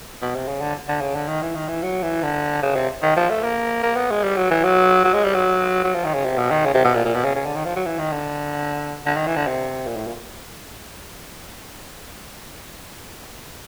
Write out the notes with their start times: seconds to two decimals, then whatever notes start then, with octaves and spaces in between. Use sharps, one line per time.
0.22 B2
0.35 C3
0.48 C#3
0.62 D3
0.89 D3
1.01 C#3
1.16 D3
1.28 D#3
1.42 E3
1.55 D#3
1.68 E3
1.83 F#3
2.03 E3
2.23 D3
2.63 C#3
2.76 C3
3.02 D#3
3.17 F3
3.30 A3
3.44 A#3
3.83 A#3
3.96 B3
4.11 G#3
4.23 G3
4.37 F#3
4.51 E3
4.64 F#3
5.05 F#3
5.14 G#3
5.24 G3
5.34 F#3
5.84 F#3
5.95 F3
6.05 D#3
6.14 C#3
6.25 C3
6.38 B2
6.51 D#3
6.66 C#3
6.74 C3
6.85 B2
6.95 A#2
7.05 A#2
7.15 B2
7.25 C#3
7.36 C#3
7.46 D3
7.56 D#3
7.65 F3
7.76 F#3
7.86 E3
7.99 D#3
8.12 D3
9.06 D3
9.16 D#3
9.27 E3
9.36 D3
9.47 C3
9.86 A#2
9.97 A2
10.07 A#2